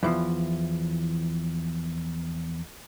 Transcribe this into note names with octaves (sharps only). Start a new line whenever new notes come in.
E2 E3 F3